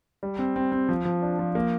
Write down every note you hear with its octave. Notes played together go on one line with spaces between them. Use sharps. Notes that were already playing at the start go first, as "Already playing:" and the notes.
G3
C4
C4
C4
F3
F3
D4
F3
A#3